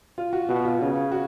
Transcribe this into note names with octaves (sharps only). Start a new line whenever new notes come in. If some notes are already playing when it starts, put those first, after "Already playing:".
F4
F#4
B2 F#4
F4
C#3 F4
F#4